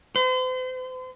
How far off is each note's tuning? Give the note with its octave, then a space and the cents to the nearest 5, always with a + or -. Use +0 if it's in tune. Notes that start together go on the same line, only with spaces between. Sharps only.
C5 -40